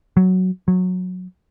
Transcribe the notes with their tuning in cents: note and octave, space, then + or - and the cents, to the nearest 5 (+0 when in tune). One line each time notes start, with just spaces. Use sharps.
F#3 +5
F#3 -15